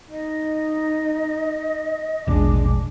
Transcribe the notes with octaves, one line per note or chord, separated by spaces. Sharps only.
D#4 D#5
E1 A#1 G#3 D4 D6